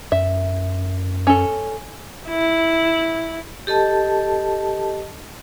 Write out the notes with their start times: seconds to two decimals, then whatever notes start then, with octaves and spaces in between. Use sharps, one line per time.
0.12 F#2 E5
1.27 C#4 A4
2.28 E4
3.67 G4 A4 D#5 A5